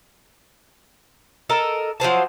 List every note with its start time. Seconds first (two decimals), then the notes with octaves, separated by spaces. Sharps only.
1.50 A4 A#4 D#5
2.00 F3 F#3 C5 A5